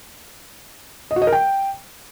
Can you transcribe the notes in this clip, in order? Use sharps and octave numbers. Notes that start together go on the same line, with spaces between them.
D#5
F#4
D#5
A#4
G5